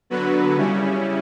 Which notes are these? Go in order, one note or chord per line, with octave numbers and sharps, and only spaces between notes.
D3 F#3 B3 F#4 B4
C#3 G3 C#4 E4